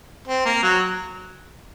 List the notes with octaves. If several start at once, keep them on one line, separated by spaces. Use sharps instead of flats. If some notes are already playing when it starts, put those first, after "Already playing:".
C4
A#3
F#3